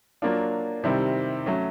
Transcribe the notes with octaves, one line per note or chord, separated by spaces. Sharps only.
F#3 A#3 D4 F4
C3 D#3 G3 C4 E4
F#3 A3 C#4